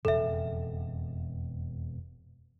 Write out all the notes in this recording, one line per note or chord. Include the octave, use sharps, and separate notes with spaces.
E1 F2 C#3 A4 E5